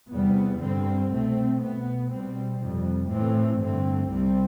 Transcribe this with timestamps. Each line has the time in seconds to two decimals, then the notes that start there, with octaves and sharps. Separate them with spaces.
0.12 E2 C3 G3 B3
0.61 G2 D3 G3 C4
1.12 C2 B2 A3 C4
1.61 B2 B3
2.11 B2 G3 C4
2.60 F2 C3 G3
3.10 A2 E3 A3 C4
3.59 G2 D3 A3 C4
4.10 C2 C3 G3 C4